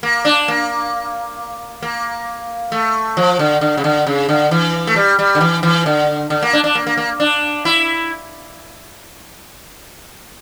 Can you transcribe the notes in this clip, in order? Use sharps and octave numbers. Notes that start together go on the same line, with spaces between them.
A#3
D4
A#3
A#3
A3
F3
D3
D3
C#3
D3
C#3
D3
E3
A3
G3
G3
D3
E3
E3
D3
D3
A#3
D4
D4
A#3
A#3
A#3
D4
E4